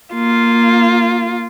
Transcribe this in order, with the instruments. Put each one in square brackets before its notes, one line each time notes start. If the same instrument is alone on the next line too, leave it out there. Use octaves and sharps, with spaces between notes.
[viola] A#3 F4